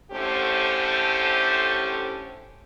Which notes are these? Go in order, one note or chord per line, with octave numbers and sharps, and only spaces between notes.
A2 D3 A3 C#4 G4 C5